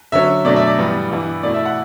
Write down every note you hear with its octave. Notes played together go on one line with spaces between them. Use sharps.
D3 F#3 C#4 E5
B2 F#3 A3 D4 D5
E5
D5
G2 E3 G3 B3
G2 E3 B3 E4
B2 A3 E4 D5
E5
F#5